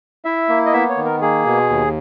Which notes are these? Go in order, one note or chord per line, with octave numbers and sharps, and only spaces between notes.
E4 E5
A#3
D#5
B3 E5
C#5
D#3
A#4
A#3 G#4
B2
D#2